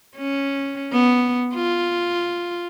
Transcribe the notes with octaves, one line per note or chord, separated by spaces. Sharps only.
C#4
B3
F4